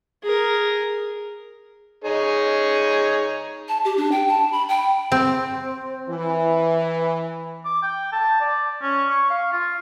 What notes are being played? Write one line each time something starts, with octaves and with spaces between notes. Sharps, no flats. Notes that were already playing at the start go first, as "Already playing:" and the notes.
G#4 A#4
D#4 G#4 C#5
A5
G4
D4
G5
A5
B5
G5
C4
E3
D6
G5
A5
D5
C#4
C#6
F5
F4